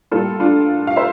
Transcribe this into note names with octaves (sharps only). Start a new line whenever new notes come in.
A2 G3 A#3 F4 A4
D4 F4
F5
C5 E5